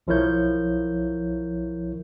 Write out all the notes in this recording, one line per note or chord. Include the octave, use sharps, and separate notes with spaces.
B1 F3 E4 A#4 C#5 G6